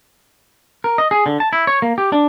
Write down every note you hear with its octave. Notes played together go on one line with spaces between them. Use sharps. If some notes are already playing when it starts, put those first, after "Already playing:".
A#4
D#5
G#4
D3
A5
E4
C#5
A#3
G4
D4